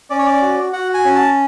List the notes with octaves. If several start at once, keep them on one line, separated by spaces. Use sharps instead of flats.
C#4 D5
C#5
D5
F#4
F#4 F#5
G#5
C#4
A5